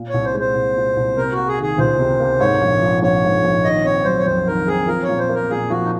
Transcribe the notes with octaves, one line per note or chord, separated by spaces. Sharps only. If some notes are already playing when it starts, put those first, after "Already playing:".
Already playing: A#2
C2 C#5
C5
G#3
C5
C2
A#2
C2
C3 A#4
A#3 F#4
G#4
D#3
G#4
C#2 C5
C3
A#3
G#2 C#5
A#1
F3
A#1 C#5
G#2
A#1
D#3 D#5
C4 C#5
F#3 C5
C#5
F2 C5
D#3 A#4
C4 G#4
F3 A#4
C#5
A#2
C5
A#3
A#4
A#2 G#4
F3 F#4
D#4